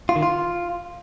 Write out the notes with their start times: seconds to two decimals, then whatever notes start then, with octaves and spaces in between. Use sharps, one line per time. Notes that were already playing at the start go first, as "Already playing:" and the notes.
0.09 F4
0.16 D#3
0.23 F4